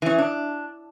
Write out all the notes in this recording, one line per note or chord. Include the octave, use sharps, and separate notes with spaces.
E3 C#4
D4